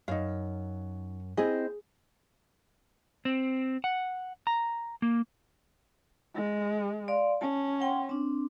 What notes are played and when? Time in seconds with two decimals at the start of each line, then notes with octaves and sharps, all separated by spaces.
0.08 F#2 D#4 F5
1.37 C4 E4 G#4 D#5
3.25 C4
3.84 F#5
4.47 A#5
5.02 A#3
6.35 G#3
7.08 D5 F5 C6
7.41 C#4 A5
7.80 F#5 G5 C6
8.09 C4 D4